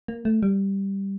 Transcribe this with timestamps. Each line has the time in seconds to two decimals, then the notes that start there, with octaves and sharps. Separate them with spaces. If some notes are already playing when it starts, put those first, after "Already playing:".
0.08 A#3
0.25 A3
0.43 G3